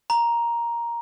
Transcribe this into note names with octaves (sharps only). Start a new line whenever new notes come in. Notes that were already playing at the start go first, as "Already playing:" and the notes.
A#5